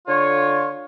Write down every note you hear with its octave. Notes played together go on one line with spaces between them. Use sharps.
D3 F4 C#5